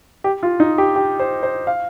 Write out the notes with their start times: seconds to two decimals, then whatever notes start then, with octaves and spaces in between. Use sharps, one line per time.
0.24 G4
0.43 F4
0.60 D#4
0.78 G4
0.96 G4
1.20 C5
1.43 C5
1.67 F5